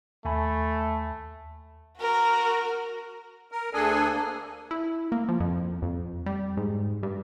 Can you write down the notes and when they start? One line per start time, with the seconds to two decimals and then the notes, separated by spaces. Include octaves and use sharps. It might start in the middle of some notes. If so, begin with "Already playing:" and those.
0.25 D#2 A3 G#5 B5
1.99 F#4 A#4
3.52 A#4
3.73 D2 D4 G#4 A4 G#5
4.12 A#3
4.71 E4
5.12 A#3
5.29 F3
5.40 F2
5.82 F2
6.26 G3
6.57 G#2
7.03 G2